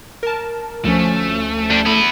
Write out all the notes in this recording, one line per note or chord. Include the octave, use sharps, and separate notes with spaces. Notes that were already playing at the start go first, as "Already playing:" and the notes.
A#4 A5
D2 F3 A3 C#4
G3 D4
D3 B3 E4